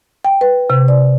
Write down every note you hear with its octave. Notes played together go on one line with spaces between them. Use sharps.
G5
B4
C3
D5